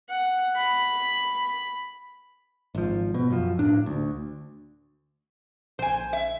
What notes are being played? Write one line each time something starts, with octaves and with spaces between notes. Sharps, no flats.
F#5
B5
G#1 F3
B2
F#2 F3
A2 D4
D2
A#1 C5 G#5
E5